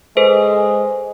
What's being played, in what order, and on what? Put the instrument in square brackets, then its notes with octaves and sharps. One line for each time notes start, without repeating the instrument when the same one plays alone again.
[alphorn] G#3 [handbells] A4 B4 C5